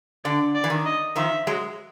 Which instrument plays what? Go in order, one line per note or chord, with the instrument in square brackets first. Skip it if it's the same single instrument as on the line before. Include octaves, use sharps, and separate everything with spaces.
[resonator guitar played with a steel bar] D3 [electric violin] D5
[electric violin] D5
[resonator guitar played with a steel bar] E3
D#3
[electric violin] D#5
[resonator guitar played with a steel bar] D#3 F3 [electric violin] E5
[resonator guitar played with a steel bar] F#3 G#3